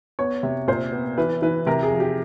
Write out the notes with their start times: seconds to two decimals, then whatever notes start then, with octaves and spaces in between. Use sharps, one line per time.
0.19 B3 C#5
0.43 C3
0.67 A#2 C5
0.92 B3
1.18 E3 B4
1.42 E3 B4
1.67 C3 A#4
1.83 G#4
1.91 F3
2.00 G4